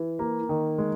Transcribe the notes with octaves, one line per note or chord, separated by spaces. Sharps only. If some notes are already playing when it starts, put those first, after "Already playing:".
Already playing: E3
A#3
D#3
G#3